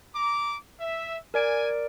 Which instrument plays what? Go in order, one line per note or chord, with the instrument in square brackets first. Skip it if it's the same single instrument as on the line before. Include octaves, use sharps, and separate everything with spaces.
[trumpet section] A#5 D6
E5
[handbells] A#4 D5 D7 [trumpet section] G#5